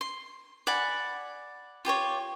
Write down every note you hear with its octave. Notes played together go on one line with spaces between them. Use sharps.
C6
D5 F#5 G#5 B5
F4 G4 C5 C#5